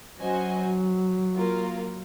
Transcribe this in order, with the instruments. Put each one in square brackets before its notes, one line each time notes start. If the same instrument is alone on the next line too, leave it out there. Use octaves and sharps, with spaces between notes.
[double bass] F#3 [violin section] C#4 F#4 C5 D#5 G#5
[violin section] A#3 F4 A#4